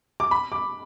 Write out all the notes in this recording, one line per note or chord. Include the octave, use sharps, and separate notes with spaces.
D6
B5
D6